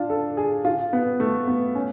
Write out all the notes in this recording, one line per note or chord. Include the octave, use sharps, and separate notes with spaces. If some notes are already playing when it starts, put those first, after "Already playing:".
Already playing: D4 F4
A4
G#4
F4
B3
A3
B3
C#4